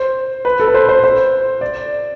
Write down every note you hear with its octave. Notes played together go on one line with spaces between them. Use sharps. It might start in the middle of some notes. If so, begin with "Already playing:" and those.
Already playing: C5
B4
A4
B4
C5
C5
C5
D5